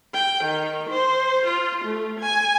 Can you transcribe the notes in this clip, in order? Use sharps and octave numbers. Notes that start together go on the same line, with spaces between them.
G5
D#3
C5
F4
A3
G#5